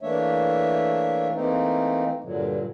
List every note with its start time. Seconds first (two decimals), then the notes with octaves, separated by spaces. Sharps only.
0.01 E3 A3 A#3 D4 C#5 E5
1.35 E3 A3 A#3 C4 D#4
2.24 G2 A#2 D3 F#3